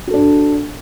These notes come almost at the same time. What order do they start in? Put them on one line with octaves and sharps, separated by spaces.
F#4 A4 D4